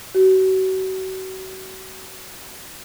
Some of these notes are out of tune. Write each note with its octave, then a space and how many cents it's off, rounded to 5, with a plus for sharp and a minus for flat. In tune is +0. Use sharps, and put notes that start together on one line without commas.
F#4 +35